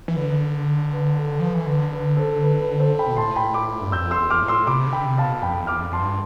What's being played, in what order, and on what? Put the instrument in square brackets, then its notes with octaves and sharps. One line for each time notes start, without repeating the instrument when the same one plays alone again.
[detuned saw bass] E3
[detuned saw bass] D3 [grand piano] B4
[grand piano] B4
A4
[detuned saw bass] F3 [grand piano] B4
[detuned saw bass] E3
[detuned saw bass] D3 [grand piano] B4
[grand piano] B4
A4 C5
B4
B4
A4 C5
G5 B5
[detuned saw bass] B2
[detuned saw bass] A2 [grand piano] A5 C6
[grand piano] G5 B5
B5 D6
[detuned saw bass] G2
[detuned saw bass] F2 [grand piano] E6 G6
[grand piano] C6 E6
[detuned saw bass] E2
[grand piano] D6 F6
[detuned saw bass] A2
[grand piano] C6 E6
[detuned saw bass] C3 [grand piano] B5 D6
[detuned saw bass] D3
[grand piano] G5 B5
[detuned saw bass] C3
[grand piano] F5 A5
[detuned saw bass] B2
[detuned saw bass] F2 [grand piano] G5 B5
[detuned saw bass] E2
[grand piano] D6 F6
[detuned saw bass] F2
[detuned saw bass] F2 [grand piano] A5 C6
[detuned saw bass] G2